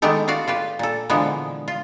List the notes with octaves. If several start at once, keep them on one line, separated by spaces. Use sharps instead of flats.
D#3 G#3 A3 B3 G4 A4
F4 F#4 D5 F5
F4 G4 B4
A#2 A4
A#2 D3 E3 F3 G#3 B3
F4